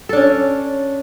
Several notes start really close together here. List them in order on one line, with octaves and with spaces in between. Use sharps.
A4 D4 C#4